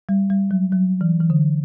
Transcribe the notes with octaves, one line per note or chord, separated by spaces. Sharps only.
G3
G3
F#3
F#3
E3
E3
D3